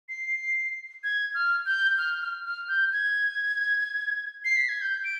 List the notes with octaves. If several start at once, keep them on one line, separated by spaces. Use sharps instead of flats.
C7
G#6
F6
G6
F6
F6
F6
G6
G#6
C7
B6
G#6
G6
D7